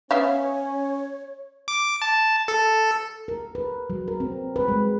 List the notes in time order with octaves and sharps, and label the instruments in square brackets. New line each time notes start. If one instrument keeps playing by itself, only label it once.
[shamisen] B3 E5 F5 [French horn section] C#4 [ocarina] C#5
[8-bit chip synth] D6
A5
A4
[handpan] A#4
B4
F#3
A#4
C4
B4
G#3